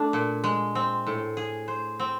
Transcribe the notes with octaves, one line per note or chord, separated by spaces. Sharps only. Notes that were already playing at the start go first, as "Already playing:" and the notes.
Already playing: A3 D4
A#2
G#3
C4
A2
G#4
C5
C4